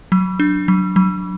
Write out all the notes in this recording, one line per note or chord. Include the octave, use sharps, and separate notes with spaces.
F#3
D4
F#3
F#3